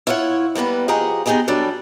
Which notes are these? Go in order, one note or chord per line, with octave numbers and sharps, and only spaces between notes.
E4 F4 C#5 F5 F#5
G3 A#3 B3 B4 F#5
F3 G4 G#4 D#5 F#5 A#5
B3 D#4 G4 G#4 D#5 A#5
F#3 G3 D4 A4